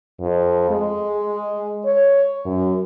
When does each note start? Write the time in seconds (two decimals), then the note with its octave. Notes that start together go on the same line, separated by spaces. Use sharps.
0.20 F2
0.70 G#3
1.85 C#5
2.45 F#2